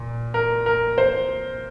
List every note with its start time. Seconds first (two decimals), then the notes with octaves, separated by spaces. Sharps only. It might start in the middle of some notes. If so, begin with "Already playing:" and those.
Already playing: A#2
0.34 A#4
0.66 A#4
0.98 C5